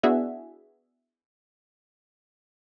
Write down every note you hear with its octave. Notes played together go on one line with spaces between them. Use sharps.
B3 D4 E4 F#4 G#4 E5